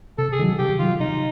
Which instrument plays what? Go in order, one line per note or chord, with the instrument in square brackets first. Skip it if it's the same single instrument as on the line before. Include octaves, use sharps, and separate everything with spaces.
[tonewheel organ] C3 [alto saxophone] A4
[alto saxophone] G#4
[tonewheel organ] D#3 F#3
[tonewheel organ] C3 [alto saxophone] G4
[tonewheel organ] D#3 F#3 [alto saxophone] F4
[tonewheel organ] C3 [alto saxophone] D#4